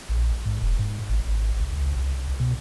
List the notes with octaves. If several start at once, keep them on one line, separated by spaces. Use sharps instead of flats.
A#1
G#2
E1
G#2
G#1
G#1
C2
C#2
C2
B2